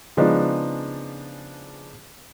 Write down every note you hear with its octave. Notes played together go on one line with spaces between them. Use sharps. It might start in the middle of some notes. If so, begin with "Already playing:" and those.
C#3 F3 G#3 B3 D4 D#4